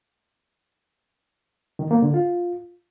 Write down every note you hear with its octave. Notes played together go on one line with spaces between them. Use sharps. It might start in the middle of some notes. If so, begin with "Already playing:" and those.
D#3
A#3
D3
F4